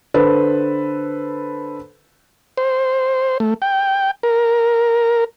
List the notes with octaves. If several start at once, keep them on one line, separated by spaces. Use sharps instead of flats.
D3 A4 B4 C5
C5
A3
G5
A#4